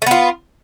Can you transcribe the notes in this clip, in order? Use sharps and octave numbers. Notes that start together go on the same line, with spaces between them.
A3 B3 F4